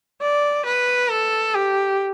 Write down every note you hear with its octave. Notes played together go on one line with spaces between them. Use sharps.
D5
B4
A4
G4